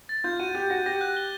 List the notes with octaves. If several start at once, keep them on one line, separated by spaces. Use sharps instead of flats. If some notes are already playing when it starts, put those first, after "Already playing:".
A6
F4 G6
F#4 D#7
G4 G6
F#4 A#6
G4 A#6
F#6
G7